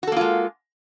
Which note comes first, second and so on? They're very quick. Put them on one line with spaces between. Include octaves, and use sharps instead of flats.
F#4 A4 A#3 F4 G#3